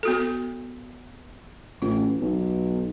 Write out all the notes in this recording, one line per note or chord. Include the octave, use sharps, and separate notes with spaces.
B3 F#4 A4
A1 F4
B1